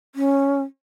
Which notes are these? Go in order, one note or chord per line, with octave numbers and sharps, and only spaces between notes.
C#4